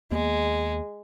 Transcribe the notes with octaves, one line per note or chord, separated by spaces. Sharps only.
D#2 G#3 A#3 B3